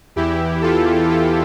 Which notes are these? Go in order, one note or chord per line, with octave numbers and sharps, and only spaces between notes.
E2 E3 E4 G4
F4 A4
F4 A4